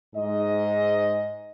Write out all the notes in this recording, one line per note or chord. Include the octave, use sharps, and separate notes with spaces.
G#2 D#5